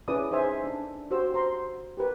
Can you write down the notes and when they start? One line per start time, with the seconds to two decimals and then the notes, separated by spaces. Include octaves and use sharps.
0.08 C#4 E4 G#4 B4 D5 D#6
0.31 D#4 G#4 C5 E5 G#5
0.64 D4
1.11 F#4 G4 C5 E6
1.34 C5 A#5 C6
1.97 G4 A#4 B4